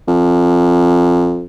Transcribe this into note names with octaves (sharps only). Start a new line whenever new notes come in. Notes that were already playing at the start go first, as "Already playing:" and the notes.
F2